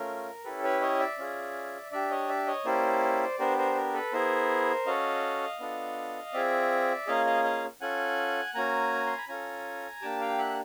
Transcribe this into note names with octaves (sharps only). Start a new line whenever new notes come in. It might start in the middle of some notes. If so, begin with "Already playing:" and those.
Already playing: A3 C#4 F4 A#4
C#4 E4 G4 A4 B4
B4 C#5
C#5 D#5
D5 E5
C#4 F4 G#4
D4 G4 D5 E5
C#5 D#5
D5 E5
C#5 D#5
A#3 C#4 E4 G4 C5 D5
B3 D4 G4 A#4 C5
A#4 C5
A#4
A4 B4
B3 E4 G#4 A#4 C5
C#4 F#4 A4 D#5 F5
B3 D4 F4 A4
C4 F4 G#4 D5 E5
A#3 C#4 F4 G#4 D#5 F5
D#5 F5
D#5 F5
C#4 F4 A4 F#5 G#5
A#3 C#4 F#4 G#5 A#5
C6
B5
C#4 F4 A4 G#5 A#5
A#3 D4 G4 G5 A5
F5 G5
E5 F#5